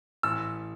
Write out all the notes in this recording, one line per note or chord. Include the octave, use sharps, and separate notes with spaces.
A1 E6